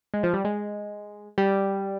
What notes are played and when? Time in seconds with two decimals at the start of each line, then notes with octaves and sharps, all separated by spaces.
0.14 G#3
0.23 F3
0.33 G3
0.45 G#3
1.38 G3